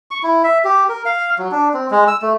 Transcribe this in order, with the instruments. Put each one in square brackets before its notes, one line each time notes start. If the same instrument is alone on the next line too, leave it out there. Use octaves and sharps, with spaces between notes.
[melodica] C#6
E4
E5
G4
A#4
F5
F#3
D4
C4
G#3
E6
A3